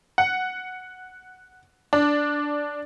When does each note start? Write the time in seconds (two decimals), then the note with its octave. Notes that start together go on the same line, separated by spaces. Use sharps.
0.18 F#5
1.93 D4